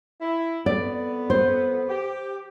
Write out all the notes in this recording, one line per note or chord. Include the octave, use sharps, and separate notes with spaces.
E4
F2 B3 D5
C5
G4